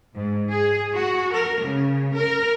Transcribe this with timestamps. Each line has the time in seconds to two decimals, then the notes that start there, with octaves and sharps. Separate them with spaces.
0.15 G#2
0.50 G#4
0.95 F#4
1.34 A#4
1.64 C#3
2.15 A#4